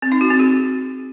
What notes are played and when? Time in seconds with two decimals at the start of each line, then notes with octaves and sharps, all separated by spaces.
0.02 C4
0.12 D#4
0.21 F#4
0.30 C4
0.39 G#4